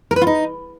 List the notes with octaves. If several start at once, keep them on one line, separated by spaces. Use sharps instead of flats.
A#4
B4
F4
D#4